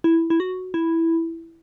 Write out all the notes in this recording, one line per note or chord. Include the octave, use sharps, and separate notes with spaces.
E4
E4
F#4
E4